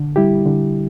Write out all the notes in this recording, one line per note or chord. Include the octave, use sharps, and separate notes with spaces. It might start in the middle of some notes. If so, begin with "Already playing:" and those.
Already playing: D3
G3 E4 G4
D3